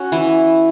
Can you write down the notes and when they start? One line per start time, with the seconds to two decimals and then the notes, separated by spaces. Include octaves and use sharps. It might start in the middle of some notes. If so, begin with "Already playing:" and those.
Already playing: C#4 F#4
0.12 E3